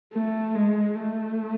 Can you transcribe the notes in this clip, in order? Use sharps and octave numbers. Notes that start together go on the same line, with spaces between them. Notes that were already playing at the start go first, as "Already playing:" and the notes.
A3
G#3
A3